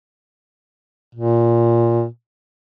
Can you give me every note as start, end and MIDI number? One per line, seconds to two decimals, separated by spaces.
1.15 2.05 46